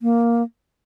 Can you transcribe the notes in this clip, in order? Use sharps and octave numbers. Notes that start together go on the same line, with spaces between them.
A#3